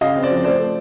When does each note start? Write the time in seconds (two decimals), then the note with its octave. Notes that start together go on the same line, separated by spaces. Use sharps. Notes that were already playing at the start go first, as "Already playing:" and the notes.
0.01 C#3 D#5 F5
0.16 C4
0.23 C5 D5
0.30 F3
0.44 A3 C5 D5
0.60 A3